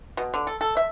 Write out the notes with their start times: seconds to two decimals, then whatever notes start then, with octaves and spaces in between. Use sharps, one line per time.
0.17 B2
0.34 D3
0.47 A4
0.61 A4
0.77 E5